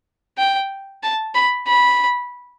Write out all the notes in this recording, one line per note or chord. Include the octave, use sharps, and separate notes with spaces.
G5
A5
B5
B5